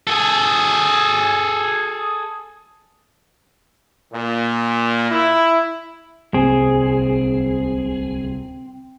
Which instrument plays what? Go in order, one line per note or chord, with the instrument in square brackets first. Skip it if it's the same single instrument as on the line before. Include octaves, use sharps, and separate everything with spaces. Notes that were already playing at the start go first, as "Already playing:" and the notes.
[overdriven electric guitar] G#4 A4
[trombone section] A#2
E4
[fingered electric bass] D1 C2 C3 [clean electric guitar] C4 [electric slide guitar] G#4